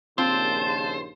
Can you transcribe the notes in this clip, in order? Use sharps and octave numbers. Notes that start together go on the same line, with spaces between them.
A#1 D#2 C#3 C4 F4 C5 A5